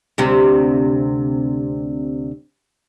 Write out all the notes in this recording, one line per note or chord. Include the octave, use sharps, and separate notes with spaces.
D2 C3 C4